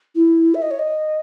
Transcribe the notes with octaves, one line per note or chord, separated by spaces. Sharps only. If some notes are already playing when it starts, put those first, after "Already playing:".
E4
E5
D#5
C#5
D#5